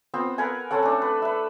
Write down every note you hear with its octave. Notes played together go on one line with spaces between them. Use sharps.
B3 C4 F4
A#4 B4 F#5 G#5
C4 C#4 A4 F#5
A3 D4
B4
B4 E5